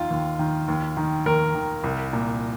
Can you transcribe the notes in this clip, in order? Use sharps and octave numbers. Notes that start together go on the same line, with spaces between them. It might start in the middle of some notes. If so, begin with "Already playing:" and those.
Already playing: D#2 D#3 F4
D#2
D#3
D#2
D#3
D#2 A#4
D#3
C2
A#2